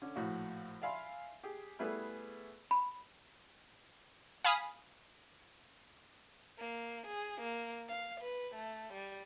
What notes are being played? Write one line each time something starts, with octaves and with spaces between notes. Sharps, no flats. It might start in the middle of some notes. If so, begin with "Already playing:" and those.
D3 C#4
A#1 A2 F#4
D5 E5 F5 G#5 B5 C6
G4 G#4
G3 A3 B3 E4 G#4 B4
B5
F5 G#5 B5 D#6
A#3
G#4
A#3
F5
B4
A3
G3